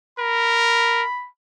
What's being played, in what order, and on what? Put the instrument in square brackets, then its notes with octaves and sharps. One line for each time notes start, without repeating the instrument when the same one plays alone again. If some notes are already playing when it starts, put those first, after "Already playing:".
[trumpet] A#4 [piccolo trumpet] B5